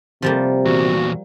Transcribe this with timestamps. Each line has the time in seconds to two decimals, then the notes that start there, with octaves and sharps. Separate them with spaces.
0.22 C3 F3 G3 A#3
0.65 E2 A#2 F#4